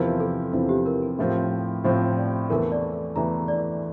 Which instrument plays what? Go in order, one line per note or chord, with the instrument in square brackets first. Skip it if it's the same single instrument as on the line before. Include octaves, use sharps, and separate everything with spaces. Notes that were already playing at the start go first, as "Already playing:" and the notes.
Already playing: [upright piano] E2 C3 F3 C4 E4 [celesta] A#4
[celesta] A4
[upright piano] E2 C3 F3 C4 E4
[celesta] G4
A#4
A4
[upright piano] A2 F3 C4 [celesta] A#4
[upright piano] A2 F3 C4 [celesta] C5
[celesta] D5
[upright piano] E2 E3 A3 E4 [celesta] A#4
[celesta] D5
[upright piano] E2 E3 A3 E4 [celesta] A#5
[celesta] D5